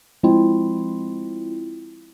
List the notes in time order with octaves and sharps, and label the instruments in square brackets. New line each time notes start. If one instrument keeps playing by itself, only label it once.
[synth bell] F3 G#3 C4 E4 F4